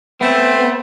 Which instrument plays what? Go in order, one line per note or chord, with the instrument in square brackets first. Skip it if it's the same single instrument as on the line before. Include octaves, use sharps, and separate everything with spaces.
[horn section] A3 C4 [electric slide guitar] B3